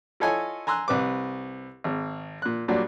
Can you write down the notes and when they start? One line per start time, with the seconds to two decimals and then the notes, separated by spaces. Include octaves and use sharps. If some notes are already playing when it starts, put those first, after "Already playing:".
0.20 E4 F4 A4 C#5 D#5 G#5
0.67 G#5 A#5 C6 E6 F#6
0.88 C2 B4 D6
1.84 G#1
2.42 A#2 F#6
2.68 A#2 F#3 G3 D4